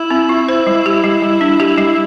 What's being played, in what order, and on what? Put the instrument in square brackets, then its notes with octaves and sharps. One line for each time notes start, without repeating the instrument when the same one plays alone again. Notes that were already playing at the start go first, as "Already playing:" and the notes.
Already playing: [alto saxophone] E4
[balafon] C4
F4
C5
G3
G4
G3
G3
D4
G4
G3